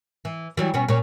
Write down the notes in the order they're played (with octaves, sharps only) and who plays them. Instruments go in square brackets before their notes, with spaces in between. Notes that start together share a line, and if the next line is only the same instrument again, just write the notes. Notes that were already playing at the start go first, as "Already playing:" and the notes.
[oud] E3
E3 F#3 G3
B2 B3 C#4
A#2 C#4